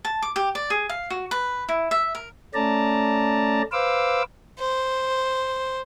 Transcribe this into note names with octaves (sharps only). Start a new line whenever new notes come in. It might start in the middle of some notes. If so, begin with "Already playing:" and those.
A5
D6
G4
D5
G#4
F5
F#4
B4
E4
E5
A#4
A3 C#4 D5 A5 A#5
B4 C5 F5 D6 E6
C5